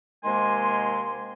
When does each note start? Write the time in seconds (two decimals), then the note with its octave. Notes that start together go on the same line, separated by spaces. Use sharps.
0.24 C3 D#3 G#3 A#3 G#5 C6